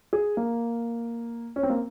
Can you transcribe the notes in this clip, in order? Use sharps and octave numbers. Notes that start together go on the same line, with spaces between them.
G#4
A#3
C#4
C4
A#3